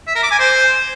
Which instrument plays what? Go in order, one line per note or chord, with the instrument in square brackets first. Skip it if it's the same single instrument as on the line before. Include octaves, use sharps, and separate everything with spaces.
[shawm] E5
A#4
D6
G#5
C5